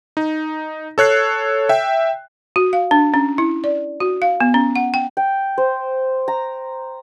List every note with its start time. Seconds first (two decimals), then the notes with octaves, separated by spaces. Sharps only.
0.17 D#4
0.98 A4 C#5 F#6 C7
1.69 E5 G5
2.56 F#4
2.73 F5
2.91 D4
3.14 C#4
3.38 E4
3.64 D5
4.00 F#4
4.22 F5
4.40 B3
4.54 C#4
4.76 F#5
4.94 G5
5.17 G5
5.58 C5
6.28 A#5